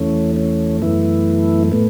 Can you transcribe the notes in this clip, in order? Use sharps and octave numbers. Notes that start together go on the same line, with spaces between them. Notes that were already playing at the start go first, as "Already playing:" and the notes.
Already playing: E2 E3 A3 C#4
C#4
F#2 E3 A3 B3 E4
A2 A3 B3